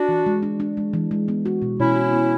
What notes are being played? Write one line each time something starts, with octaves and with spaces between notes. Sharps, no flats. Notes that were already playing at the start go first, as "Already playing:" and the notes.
Already playing: D4 F#4
E3
G#3
D4
D4
G#3
E3
G#3
B3
F#4
B2
B2 C#4 E4
F#4
B3